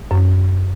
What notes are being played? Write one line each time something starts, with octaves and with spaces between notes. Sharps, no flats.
F#2